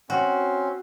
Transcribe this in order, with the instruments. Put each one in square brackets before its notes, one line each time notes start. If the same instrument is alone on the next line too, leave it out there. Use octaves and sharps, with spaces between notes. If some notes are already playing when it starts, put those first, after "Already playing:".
[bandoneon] C4 C#4 [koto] F#4